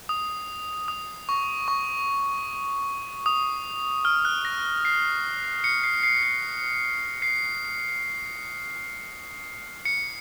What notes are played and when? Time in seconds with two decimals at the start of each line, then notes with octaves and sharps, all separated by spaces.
0.09 D#6
0.88 D#6
1.29 C#6
1.68 C#6
3.26 D#6
4.05 F6
4.25 F#6
4.45 A#6
4.85 C7
5.64 C#7
5.84 C7
6.03 C7
6.23 C7
7.22 C7
9.85 C#7